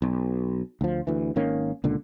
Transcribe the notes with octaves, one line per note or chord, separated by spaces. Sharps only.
B1
D2 F3
D2 E3
G#1 D#3 A#3 C#4
C#2 A#2 D3